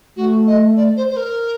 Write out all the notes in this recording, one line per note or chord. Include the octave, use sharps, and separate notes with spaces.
A3 F#4
D#5
D5
C5
C5
A#4